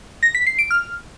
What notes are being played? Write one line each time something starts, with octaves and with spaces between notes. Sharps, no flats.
A#6
B6
C7
D7
F6